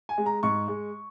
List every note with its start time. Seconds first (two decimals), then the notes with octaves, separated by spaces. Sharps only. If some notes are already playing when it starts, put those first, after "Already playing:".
0.09 G#5
0.18 G#3
0.26 A#5
0.43 G#2 C#6
0.68 G#3